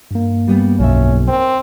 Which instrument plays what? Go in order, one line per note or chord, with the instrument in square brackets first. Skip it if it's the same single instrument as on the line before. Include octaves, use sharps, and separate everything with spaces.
[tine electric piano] G2 A#3
[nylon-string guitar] G3 B3 C#4
[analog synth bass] B1 [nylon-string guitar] F2 E5 [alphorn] C#4
[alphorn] C4 [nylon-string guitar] A#4